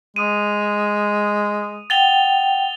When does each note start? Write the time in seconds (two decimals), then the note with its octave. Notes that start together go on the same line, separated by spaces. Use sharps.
0.16 G#3 D#6 D#7
1.90 F#5 G5 A6 F7 G7